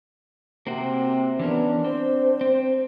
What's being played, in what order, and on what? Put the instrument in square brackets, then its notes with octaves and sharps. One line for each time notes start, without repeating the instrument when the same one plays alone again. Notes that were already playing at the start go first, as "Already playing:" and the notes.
[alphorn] C3 [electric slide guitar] A#3 C4 F#4
[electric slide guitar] E3 C#4 A#4 [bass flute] B3 [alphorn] D4
[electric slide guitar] C4 [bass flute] C5
[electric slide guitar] C4